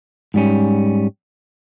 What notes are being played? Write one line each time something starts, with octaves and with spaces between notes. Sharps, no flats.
G#2 G3 C#4